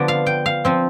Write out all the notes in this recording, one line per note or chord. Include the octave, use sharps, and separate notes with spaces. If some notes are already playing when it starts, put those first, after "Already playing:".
Already playing: D3 F3 B3 D5
F5
G5
F5
F3 C4